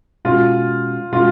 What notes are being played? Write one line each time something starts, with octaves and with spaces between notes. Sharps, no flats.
B2 G#3 C#4 F4 F#4
B2 G#3 C#4 F4 F#4